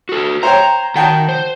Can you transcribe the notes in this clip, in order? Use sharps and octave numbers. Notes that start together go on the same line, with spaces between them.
F#4 A4
C5 C#5 G5 A#5
D#3 F#4 G5 A5 A#5
C5